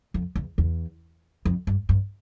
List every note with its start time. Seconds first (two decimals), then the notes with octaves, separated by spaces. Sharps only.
0.14 F2
0.35 E2
0.58 E2
1.45 F2
1.67 G2
1.89 G2